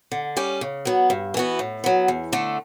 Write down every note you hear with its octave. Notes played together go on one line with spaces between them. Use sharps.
D3
G3 C#4 G4
C#3
F#3 B3
G2
E3 B3 F#4
A2
F#3 B3
E2
D3 A3